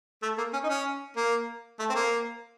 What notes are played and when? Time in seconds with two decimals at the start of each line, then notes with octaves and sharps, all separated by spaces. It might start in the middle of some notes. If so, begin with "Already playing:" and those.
0.23 A3
0.38 A#3
0.53 C#4
0.64 D#4
0.69 C#4
1.17 A#3
1.79 A3
1.90 C4
1.95 A#3